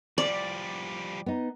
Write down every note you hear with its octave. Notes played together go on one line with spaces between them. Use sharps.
F3 G3 D5
B3 D#4